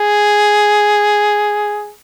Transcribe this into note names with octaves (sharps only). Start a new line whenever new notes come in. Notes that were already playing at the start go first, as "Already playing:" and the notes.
Already playing: G#4